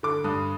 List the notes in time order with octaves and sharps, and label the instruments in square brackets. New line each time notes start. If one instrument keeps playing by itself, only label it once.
[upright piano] D3 D6
G2 D#6